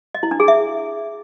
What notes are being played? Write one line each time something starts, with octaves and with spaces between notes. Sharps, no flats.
D#5
E4
D4
G#4
E5